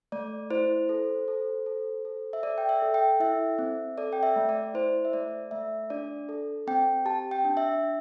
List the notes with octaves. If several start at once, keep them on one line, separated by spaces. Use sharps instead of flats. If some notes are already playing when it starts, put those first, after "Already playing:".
A3 D5
E4 C5
A4
A4
A4
A4
E5
A4 D5
G5
E5
A4
G5
E4 E5
C4
A4 D5
G5
E5
A3
D5
E4 C5
E5
A3 D5
A3 E5
D4 D5
A4
C4 G5
G4 A5
G5
D4
E5
D4